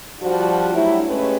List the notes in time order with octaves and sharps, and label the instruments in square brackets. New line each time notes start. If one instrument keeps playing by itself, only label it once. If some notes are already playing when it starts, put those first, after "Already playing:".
[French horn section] F3 G3 D4 F#4
F#3 G3 A3 D4 E4
G#3 A3 C#4 G4 G#4 B4